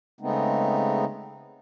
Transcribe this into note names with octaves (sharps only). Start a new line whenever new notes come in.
C#3 G#3 A3 B3 C4 D#4